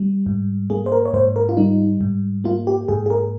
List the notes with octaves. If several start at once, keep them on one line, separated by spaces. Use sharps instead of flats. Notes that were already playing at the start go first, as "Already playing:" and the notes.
Already playing: G3
G#2
A#3 G#4
C5
A#4
C#5
G#2 C5
A#4
F4
G3 D#4
G#2
A#3 F4
G4
G#2 G#4
G#4
A#4